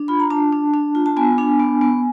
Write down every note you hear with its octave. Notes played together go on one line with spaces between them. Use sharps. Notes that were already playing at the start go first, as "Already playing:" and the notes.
Already playing: D4
F4 B5
A#5
D4 A5
D4
D4
F4
A5
B3 G#5
D4
B3
B3